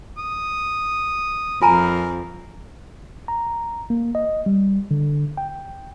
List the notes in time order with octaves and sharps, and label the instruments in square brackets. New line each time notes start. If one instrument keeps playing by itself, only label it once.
[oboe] D#6
[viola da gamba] F2 [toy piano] F4 G#5 A#5 [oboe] A#4
[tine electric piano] A#5
A#3
D#5
G3
D3
G5